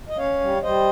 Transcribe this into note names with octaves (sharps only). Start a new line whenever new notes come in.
D#5
C#4 C#5 F5
G3
G3 C5 D#5